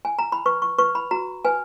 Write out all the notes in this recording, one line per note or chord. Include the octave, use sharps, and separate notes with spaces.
G#5
A#5
B5
B4 C#6
C#6
B4 C#6
B5
F#4 A#5
B4 G#5